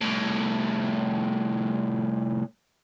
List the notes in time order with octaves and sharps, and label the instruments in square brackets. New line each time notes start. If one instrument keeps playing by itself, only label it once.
[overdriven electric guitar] C2 A2